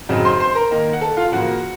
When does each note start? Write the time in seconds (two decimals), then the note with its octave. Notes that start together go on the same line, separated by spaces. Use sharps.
0.09 F#2 C#3 F#3 C4 D#4
0.25 C5 C6
0.40 C5 C6
0.55 A#4 A#5
0.71 D#3 A#3 D#4
0.93 F#5
1.01 A4 A5
1.17 F4 F5
1.32 C#3 F3 A#3 F#4 F#5